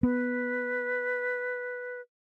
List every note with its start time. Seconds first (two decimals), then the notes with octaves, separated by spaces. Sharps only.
0.03 B3 B4